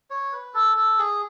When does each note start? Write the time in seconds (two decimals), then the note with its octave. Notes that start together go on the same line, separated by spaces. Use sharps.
0.10 C#5
0.32 B4
0.54 A4
0.76 A4
0.98 G#4